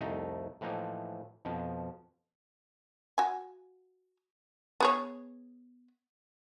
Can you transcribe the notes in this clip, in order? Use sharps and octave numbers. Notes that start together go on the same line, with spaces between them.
C2 F2 A3 D#4
A2 E3 F3 A#3 D#4
F2 B2 F3
F#4 G#5
B3 G#4 C#5